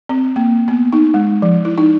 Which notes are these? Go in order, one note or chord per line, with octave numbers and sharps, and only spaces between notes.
C4
A#3
B3
D#4
G#3
F3
E4
D#4